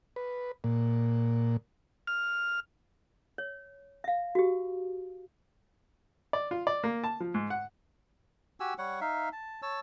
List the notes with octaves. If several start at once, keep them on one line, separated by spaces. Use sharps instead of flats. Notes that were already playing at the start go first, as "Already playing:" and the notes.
B4
A#2
F6
C#5
E5 F5
F#4 G4
D5
F4
D5
A#3
A5
F3
G#2
F#5
F#4 G4 G#5 E6
G3 C#5 F#5
D#4 E5 F5
A5
C#5 A5 E6